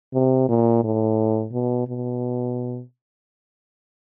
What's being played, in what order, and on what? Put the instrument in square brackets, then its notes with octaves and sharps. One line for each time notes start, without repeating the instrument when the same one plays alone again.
[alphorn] C3
A#2
A2
B2
B2